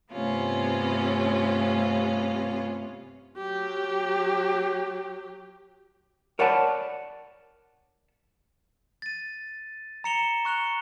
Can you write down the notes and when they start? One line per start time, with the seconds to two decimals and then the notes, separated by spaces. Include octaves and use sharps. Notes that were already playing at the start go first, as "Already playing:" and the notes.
0.12 G2 C3 A3 B3 C#4 F4
3.37 F#3 G4
6.39 A#4 C#5 D5 F#5 A5 B5
9.02 A6 D#7
10.04 A#5 A#6 C#7 E7 F7 G7
10.45 C#6 F#6 C#7 F7 G7